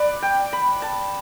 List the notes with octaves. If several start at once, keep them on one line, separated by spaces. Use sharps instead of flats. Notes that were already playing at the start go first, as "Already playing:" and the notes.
Already playing: B4 D5
G5
B5
A5